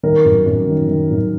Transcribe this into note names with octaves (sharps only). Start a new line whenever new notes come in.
D#3 A#4
F#2
F#2
D#3
D#3
F#2